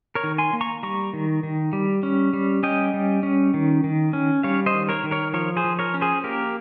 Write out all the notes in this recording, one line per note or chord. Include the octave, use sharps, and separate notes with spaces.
A#4 C#5
D#3
G#5 C6
A#3
A#5 C#6
G3 A#5 C#6
D#3
D#3
G3
C#4
G3
C#4 D#5 G5
G3
C#4
D#3
D#3
C#4
G3 C#5 F5
C5 D#5
D#3
A#4 C#5
D#3
A#4 C#5
F3 A#4 C#5
G#4 C5
F3
A#4 C#5
C#4
G#4 C5
A#3 G4 A#4